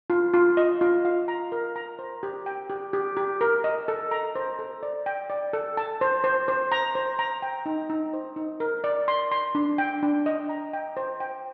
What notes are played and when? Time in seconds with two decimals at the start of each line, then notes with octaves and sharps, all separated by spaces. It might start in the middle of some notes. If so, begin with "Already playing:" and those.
0.10 F4
0.34 F4
0.57 D#5
0.81 F4
1.05 F5
1.28 A#5
1.52 A#4
1.76 A#5
1.99 C5
2.23 G4
2.46 G5
2.70 G4
2.93 G4
3.17 G4
3.41 A#4
3.64 D#5
3.88 A4
4.11 A#5
4.35 C5
4.59 A4
4.83 D5
5.06 G5
5.30 D5
5.53 A4
5.77 A5
6.01 C5
6.24 C5
6.48 C5
6.72 A#5
6.95 C5
7.19 A#5
7.42 G5
7.66 D#4
7.90 D#4
8.13 C5
8.36 D#4
8.60 A#4
8.84 D5
9.08 C6
9.31 C6
9.55 D4
9.78 G5
10.03 D4
10.26 D#5
10.49 A#5
10.73 G5
10.97 C5
11.20 G5